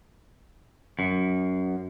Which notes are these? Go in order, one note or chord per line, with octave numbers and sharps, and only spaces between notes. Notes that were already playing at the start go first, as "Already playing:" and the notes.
F#2